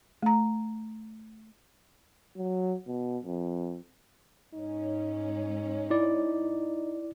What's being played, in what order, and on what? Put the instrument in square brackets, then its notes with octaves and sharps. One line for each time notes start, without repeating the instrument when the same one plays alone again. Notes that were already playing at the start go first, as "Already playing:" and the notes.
[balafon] A3 A#5
[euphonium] F#3
B2
F2
[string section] G#2 C#4 [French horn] D#4
[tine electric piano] E4 D5